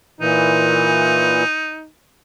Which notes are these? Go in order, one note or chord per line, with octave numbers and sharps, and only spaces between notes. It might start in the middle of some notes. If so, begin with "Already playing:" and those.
A#2 E3 D#4